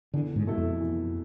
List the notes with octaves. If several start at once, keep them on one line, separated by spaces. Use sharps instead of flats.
E2 D3
G#2
B2 A3 E4 A4
F2
E2